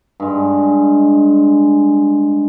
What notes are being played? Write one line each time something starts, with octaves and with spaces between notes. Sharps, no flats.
G2 G#3